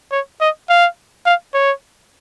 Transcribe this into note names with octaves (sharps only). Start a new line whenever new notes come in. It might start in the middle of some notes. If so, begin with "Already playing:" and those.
C#5
D#5
F5
F5
C#5